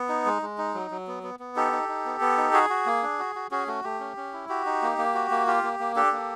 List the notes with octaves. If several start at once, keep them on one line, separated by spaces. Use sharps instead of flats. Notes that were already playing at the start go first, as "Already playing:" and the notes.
Already playing: B3
D#4
G#3
G#3
D#4
F#3
F#3
B3
B3
B3
D#4 G4 A4
D#4
D#4
B3
B3
D#4
F#4 G#4
F#4
A#3
D4
F#4
F#4
C#4 F#4 G#4
A3 F#4
A3 G4
C#4
C#4
E4
F#4 G4
D#4
A#3
A#3
F#4
A#3
F4 G4
A#3
A#3
D4 G4 A4
A#3